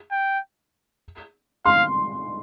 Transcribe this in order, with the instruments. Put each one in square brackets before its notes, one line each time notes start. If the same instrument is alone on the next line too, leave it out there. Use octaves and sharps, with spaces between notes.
[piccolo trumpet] G5
[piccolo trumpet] F5 [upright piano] C6